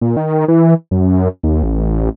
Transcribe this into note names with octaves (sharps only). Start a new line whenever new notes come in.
A#2
D#3
E3
F#2
D#2
A1